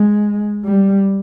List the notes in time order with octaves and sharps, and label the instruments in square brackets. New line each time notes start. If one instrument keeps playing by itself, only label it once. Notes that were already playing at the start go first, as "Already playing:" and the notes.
Already playing: [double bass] G#3
G3